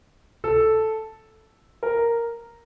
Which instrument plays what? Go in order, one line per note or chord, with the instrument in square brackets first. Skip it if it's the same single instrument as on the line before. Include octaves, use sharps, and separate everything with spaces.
[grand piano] A4
A#4